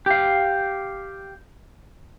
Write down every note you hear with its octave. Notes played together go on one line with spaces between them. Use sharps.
G4 F5